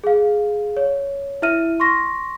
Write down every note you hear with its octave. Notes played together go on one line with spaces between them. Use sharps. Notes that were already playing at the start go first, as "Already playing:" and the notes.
G#4 F5
C#5
E4 E5 F6 D#7
C6 C#6 A#6